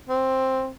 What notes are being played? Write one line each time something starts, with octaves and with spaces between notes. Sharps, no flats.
C4